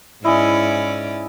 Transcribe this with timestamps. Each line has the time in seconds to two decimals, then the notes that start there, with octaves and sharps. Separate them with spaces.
0.24 G#2 C#4 E4 D5 D#5 G#5